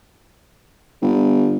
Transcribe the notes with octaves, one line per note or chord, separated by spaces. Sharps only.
G1